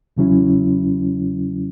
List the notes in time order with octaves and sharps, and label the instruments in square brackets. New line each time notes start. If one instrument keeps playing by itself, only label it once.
[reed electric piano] E2 C#3 F#3 C#4 E4